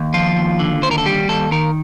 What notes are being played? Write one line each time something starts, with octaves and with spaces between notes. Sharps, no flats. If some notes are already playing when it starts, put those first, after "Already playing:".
Already playing: D#2
F3 F4
D#2
D3
D#2 C5
A#4
A4
G3 G4
D#2 A4
D#3 A#4